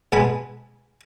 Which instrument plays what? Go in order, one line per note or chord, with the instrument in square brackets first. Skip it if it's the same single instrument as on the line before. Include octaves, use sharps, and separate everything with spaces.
[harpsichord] B2 G#3 G#5 A5 B5